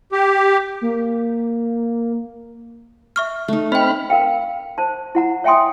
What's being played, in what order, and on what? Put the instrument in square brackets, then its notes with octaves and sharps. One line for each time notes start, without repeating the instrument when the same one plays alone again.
[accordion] G4
[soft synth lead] A#3
[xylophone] E5 C#6 F6
[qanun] A3 D#4
[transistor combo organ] C4 B5 F6 [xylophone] D#5 G5
[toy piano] A#4 F5 G5
C5 A5
E4 F#5 A#5
C#5 E5 G5 G#5 C6 D#6